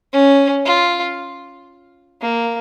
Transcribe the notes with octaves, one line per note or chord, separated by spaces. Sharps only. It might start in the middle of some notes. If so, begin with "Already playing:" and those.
C#4
F4
A#3